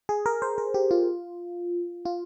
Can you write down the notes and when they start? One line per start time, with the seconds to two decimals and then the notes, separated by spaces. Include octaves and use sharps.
0.09 G#4
0.26 A#4
0.42 C5
0.58 A#4
0.74 G4
0.91 F4
2.05 F4